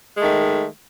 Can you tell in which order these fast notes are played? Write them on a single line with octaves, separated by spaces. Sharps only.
G#3 A3 D#3